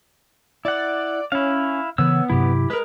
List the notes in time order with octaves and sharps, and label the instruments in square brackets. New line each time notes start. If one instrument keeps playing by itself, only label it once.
[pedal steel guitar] E4 F#5 [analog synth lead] D5
[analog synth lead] C#4 [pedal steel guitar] E4 F5
[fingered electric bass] C#3 E3 [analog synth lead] B3 [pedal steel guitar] C#5 E6
[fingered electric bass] G2 C3 F#3 [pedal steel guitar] E4 G4
[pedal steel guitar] G#3 A#4 [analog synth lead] B4